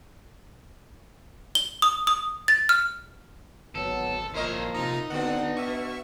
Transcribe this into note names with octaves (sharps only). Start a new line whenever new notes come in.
G7
D#6
D#6
A6
F6
G#1 F#3 B3 A4
A#2 F3 E4 A#4 C5 C#5 D#5
C3 D#4 F4 A#5
D3 B3 C4 D4 F#4 F#5
B2 E5 C#6